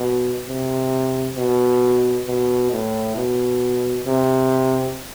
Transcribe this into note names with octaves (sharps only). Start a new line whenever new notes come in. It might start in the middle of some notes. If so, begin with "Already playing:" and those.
Already playing: B2
C3
B2
B2
A2
B2
C3